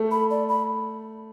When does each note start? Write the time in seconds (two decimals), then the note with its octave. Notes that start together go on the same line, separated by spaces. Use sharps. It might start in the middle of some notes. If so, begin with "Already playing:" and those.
Already playing: A3
0.11 B5
0.30 D5
0.49 B5